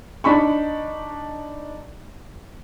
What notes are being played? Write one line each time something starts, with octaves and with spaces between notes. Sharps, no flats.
D4 D#4 B5 C#6